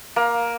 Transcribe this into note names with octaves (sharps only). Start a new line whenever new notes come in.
A#3